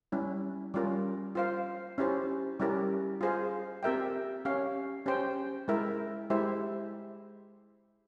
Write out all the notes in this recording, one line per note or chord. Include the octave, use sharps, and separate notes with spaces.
G3 C#4 E4
G3 C#4 F4 A#4
F4 C5 F5
C#4 E4 G4 C5
G3 C#4 E4 G4 A#4
F4 G#4 C5 F5
C4 G4 A#4 E5 G5
C#4 G4 C#5 F5
C#4 G4 C5 G5
G#3 E4 A#4 E5
G#3 E4 G4 C5 E5